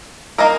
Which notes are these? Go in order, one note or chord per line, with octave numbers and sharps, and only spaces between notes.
A#3 D#4 A#4 D#5